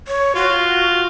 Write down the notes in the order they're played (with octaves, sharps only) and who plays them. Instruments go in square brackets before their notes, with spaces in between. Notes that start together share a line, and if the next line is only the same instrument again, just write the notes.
[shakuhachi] C#5
[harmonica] F4 [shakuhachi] F#4